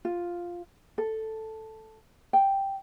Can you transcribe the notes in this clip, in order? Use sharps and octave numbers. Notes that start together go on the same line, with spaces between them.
F4
A4
G5